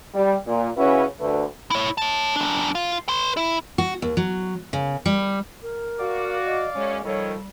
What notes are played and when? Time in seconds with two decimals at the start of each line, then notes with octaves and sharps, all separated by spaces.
0.14 G3
0.46 A#2
0.77 C#3 C#4 E4 F#4 B4 C#5
1.19 D2 D3 A3 B4
1.71 E4 C#5
1.98 C#5 A5
2.36 F#2 D4
2.75 F4
3.09 B4 C6
3.37 E4
3.78 F#4
4.02 D#2
4.17 F#3
4.73 C#3
5.06 G3
5.62 A#4
5.99 F#4 D5 F5 D6
6.45 D#5
6.75 F#2 G#3 C#4
7.04 D#3 F3 G3 A4 C#5